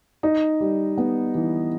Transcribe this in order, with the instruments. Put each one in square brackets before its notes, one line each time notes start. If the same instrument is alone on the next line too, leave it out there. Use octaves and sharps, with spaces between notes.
[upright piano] D#4
G3
B3
E3